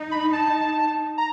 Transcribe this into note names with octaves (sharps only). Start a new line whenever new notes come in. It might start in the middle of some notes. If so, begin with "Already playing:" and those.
Already playing: D#4
B5
A5
A#5